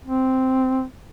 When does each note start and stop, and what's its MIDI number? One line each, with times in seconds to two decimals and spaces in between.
0.05 0.84 60